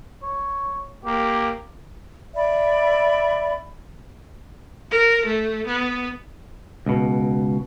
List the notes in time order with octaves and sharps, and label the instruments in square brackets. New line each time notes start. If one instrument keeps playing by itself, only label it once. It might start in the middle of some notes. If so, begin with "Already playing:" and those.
[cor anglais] C#5
[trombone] A#3 [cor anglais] G4
[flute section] D5 E5 B5
[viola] A#4
A3
B3
[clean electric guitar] C#2 B2